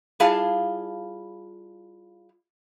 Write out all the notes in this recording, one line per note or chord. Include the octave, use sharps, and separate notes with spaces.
G3 E4 F4 G#4 F5 A5